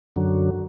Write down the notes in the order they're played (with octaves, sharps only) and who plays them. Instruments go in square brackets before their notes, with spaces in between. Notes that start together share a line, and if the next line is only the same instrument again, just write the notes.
[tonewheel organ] F#2 D3 F#3